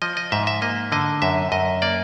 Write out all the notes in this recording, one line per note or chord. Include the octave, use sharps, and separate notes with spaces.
F3 D#5
D#5
G#2 E5
E5
A#3 D#5
D3 D#5
F#2 E5
F#2 D#5
A#3 D5